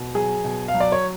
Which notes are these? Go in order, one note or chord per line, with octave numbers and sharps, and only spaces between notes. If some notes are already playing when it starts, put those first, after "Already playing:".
Already playing: B2
F#3 G#4
B2
F5
F#3
D5
C#5